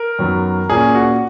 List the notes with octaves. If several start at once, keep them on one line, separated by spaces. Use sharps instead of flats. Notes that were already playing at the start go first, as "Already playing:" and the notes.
Already playing: A#4
F#2 D#3 F#3 B3
A#2 A#3 C#4 G#4
F#4